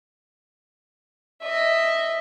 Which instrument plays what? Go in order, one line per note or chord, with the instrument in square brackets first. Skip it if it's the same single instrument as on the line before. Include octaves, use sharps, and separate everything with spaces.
[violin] D#5 E5